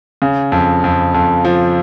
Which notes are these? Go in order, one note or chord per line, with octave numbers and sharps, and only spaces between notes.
C#3
F2
F2
F2
F3